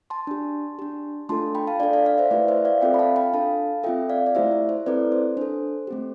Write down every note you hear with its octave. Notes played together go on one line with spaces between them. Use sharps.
A5 C6
D4 G4
D4 G4
A3 D4 F4 A4 A5 C6
G5 B5
F5 A5
D4 A4 D5 F5
D5 F5
D5 F5
C5 E5
A3 E4 G4 B4 D5
C5 E5
D5 F5
C4 F4 A4 E5 G5
B5
F5 A5
G5 B5
D4 A4 F5 A5
C4 F4 A4 E5 G5
D5 F5
D5
A3 E4 G4 C5 E5
C5
C5
C4 E4 A4 B4 D5
C5
D4 A4 C5
A3 C4 G4